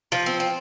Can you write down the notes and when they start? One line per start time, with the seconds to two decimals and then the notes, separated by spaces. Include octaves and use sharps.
0.12 F3
0.26 C4
0.40 C4